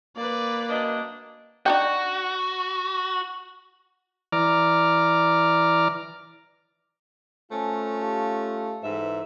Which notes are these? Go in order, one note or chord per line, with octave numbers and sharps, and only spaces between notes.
A#3 B4 D5
F#2 D4 D#5
D4 D#4 F#4 G5
E3 D5 A#5 D6 F6
A3 C#4 F4 C5 G#5 A5
G4 F5 A5
G#2 E3 A4 B4 C5 E5